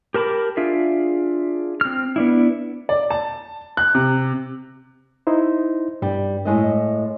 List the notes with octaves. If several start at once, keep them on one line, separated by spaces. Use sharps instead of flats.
G4 A#4 A5 B5 D6
D4 F4 G#4 E5
C4 F6
B3 D4 E4
D5
A5
F#6
C3
D#4 E4 C5
G2 G3
A2 G#3 D#5